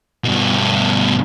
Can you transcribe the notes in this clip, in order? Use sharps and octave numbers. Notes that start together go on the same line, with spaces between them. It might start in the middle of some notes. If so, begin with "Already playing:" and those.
G2 B2